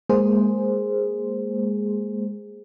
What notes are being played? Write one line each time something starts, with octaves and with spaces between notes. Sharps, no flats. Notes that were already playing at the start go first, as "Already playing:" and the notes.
G#3 A#3 G#4 C5